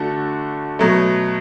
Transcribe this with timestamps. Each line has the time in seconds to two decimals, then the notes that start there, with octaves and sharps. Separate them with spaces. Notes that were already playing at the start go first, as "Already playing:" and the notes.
Already playing: D3 A3 F#4 A4
0.79 B2 F#3 A3